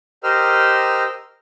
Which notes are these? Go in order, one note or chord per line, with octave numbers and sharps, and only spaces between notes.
G4 A#4 C5 D#5 E6 F6